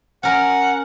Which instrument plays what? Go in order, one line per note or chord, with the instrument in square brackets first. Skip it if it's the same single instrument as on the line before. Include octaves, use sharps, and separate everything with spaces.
[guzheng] C#4 A#4 [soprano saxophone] F#5